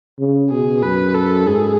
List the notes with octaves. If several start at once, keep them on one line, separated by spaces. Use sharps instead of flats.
C#3
B2 G#4
F#2 B4
A4
G#2 G#4